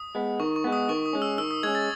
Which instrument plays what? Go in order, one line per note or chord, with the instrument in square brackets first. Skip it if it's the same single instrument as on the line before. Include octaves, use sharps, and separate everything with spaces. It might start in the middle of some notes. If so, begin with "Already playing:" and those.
Already playing: [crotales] D#6
[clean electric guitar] G#3 B3
[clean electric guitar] D#3 [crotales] C#6
[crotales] C#6
[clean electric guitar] G#3 B3
[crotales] D#6
[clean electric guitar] D#3 [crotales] C#6
[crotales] D#6
[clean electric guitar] G#3 C#4
[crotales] E6
[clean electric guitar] D#3 [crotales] E6
[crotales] D#6
[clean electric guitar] G#3 C#4 [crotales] G#6
[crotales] A6